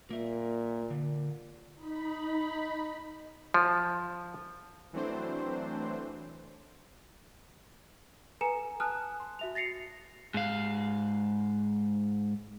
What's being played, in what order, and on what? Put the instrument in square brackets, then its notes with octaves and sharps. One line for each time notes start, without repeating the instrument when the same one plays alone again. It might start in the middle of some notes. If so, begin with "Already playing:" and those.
[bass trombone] A#2 [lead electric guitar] A#3 E5
[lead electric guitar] D3
[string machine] D#4 B5
[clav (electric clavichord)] F3
[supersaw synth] E3 F#3 A3 C4 D4 C5
[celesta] A4 B4 G#5 A#5 C#7 E7
G#5 A5 D#6 F6 F#6
C6
F#4 E5 F7
A6 A#6 C7 C#7 F7
[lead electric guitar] G#2 F5